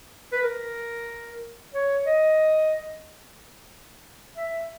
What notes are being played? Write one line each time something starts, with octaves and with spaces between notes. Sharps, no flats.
B4
A#4
C#5
D#5
E5